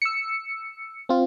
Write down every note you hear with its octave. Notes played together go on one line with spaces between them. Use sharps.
E6 C#7
C4 F4